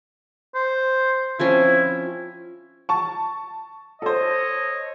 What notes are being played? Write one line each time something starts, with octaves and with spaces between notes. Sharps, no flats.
C5
F3 C4 C#4 E4
A5 C#6
A4 C5 C#5 D#5